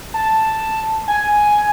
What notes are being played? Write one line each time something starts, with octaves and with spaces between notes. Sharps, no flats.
A5
G#5